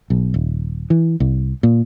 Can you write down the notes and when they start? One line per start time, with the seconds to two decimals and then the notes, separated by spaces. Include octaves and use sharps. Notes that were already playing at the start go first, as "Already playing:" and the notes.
0.10 B1
0.34 D#1
0.90 E3
1.20 C2
1.63 A#2